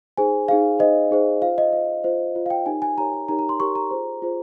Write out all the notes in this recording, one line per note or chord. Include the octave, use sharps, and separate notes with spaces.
D#4 G#4 C5 G#5
D#4 G#4 C5 F5
D#4 G#4 C5 D#5
D#4 G#4 C5
F4 C5 F5
D#5
F4 C5 F5
F4 C5
F4 C5
F5
G5
D#4 G4 A#4 C#5 G#5
G#5
D#4 G4 A#4 C#5 A#5
G#5
D#4 G4 A#4 C#5 A#5
A#5
C6
D#4 G4 A#4 C#5 C#6
A#5
F4 G#4 C5
F4 G#4 C5